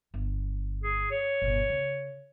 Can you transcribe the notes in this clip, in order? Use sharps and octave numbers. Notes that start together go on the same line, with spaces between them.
G1
G#4
C#5
G1 B2
C#3